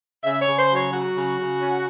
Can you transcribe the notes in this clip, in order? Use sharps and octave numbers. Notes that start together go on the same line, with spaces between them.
C#3 E5
C#5
C#3
C5
F#3
C#5
F#3 F#4
C#3
C#3
C#4